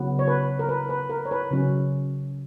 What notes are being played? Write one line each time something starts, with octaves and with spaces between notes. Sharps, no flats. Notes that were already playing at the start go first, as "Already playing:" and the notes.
Already playing: C#3 F#3 B3
C#5
B4
A#4
B4
B4
A#4
C#5
B4
C#3 F#3 C#4